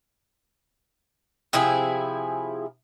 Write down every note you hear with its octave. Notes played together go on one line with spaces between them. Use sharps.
C3 F3 E4 G#4